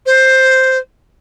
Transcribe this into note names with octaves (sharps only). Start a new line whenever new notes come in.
C5